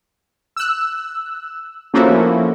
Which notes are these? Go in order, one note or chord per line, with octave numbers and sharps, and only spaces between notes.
E6 F#6
F3 A3 A#3 C#4 E4 F#4